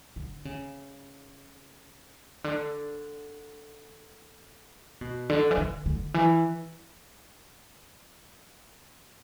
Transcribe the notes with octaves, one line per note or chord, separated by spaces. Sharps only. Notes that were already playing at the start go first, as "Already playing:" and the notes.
D3
C#3
D3
B2
D3
E3
D3
D3
E3